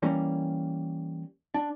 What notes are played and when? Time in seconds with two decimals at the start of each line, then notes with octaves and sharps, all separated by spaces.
0.02 E3 G3 A#3 C#4
1.54 D4